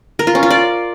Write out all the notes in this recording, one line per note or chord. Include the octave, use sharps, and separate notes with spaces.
A#4
F4
C#4
F4
D5